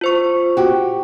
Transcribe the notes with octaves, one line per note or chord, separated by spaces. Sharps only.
F4 C5 C#6
F#4 G4